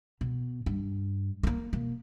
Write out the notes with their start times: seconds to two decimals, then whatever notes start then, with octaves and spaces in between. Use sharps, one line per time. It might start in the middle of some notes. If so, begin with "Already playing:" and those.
0.21 B2
0.66 G2
1.43 A3 A#3
1.73 B2 A#3